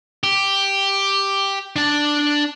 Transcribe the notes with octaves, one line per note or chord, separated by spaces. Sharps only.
G4
D4 A5